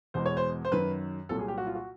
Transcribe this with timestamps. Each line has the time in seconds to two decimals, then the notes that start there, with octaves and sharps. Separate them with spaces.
0.14 E2 B2 G#3 C5
0.26 C#5
0.37 C5
0.65 C5
0.72 F#2 D#3 F#3 B4
1.29 C2 A#2 F#3 A4
1.39 G#4
1.48 G4
1.57 F#4
1.67 F4
1.75 F#4